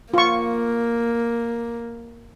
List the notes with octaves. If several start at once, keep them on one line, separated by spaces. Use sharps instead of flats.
A#3 F4 C#6